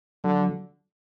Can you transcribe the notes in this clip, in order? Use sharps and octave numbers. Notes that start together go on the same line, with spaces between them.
D3 F#3